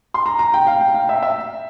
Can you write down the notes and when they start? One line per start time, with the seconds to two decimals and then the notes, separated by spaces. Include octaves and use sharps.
0.14 C6
0.26 A#5
0.39 A#5
0.54 G5
0.67 F5
0.81 G5
0.95 F5
1.09 E5
1.23 E5